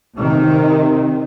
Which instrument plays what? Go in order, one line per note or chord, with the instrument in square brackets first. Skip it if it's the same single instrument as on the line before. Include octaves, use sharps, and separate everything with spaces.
[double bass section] C3 D#3